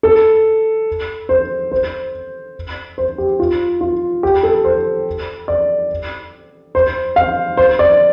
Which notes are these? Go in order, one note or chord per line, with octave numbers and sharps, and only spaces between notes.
A4
C5
C5
C5
G4
F4
F4
G4
A4
C5
D5
C5
F5
C5
D5